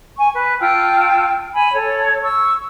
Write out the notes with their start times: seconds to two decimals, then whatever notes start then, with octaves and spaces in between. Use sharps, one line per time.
0.17 G#5 C#6
0.35 B4
0.60 F4 G5 A5 E6
1.54 G#5 B5
1.74 A4 C#5
2.23 C#6 E6